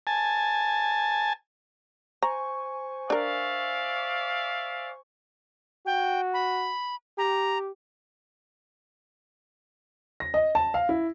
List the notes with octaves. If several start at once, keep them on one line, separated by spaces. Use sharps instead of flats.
G#5 A5
C5 G#5 A#5 C#6
D4 A#4 D5 E5 F5
F#4 G5
B5
G4 A#5
A#6
D#5
A5
F5
E4